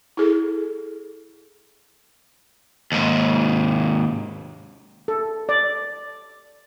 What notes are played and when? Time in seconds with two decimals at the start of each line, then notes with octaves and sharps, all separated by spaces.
0.17 E4 G#4 A4
2.92 D#2 G#2
5.08 A4
5.49 D5